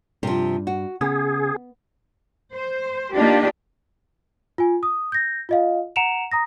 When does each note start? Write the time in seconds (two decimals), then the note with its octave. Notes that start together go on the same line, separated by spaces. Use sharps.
0.23 G2 C3 F3
0.67 F#4
1.01 C#3 B3 G#4
2.54 C5
3.14 A#3 D4 D#4 F4 G4
4.58 F4 G#5
4.83 D#6
5.12 G6 A#6
5.49 F4 D#5 F5
5.96 F#5 A#5 C#7 D7 E7 F7
6.31 A#5 D#6 A#6